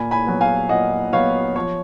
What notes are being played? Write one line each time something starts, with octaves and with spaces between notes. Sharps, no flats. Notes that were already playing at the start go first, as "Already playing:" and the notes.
Already playing: A#2 G#5 B5
G#5 B5
F#3 B3
F5 G#5
A#2 D#5 F#5
F#3 B3 C#5 F5
F3 C#5